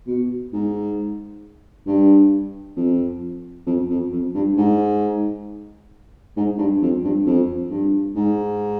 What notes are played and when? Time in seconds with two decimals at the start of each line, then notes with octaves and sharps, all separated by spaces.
0.07 B2
0.53 G#2
1.87 G2
2.76 F2
3.66 F2
3.90 F2
4.12 F2
4.34 G2
4.57 G#2
6.37 G#2
6.58 G2
6.82 F2
7.04 G2
7.26 F2
7.70 G2
8.15 G#2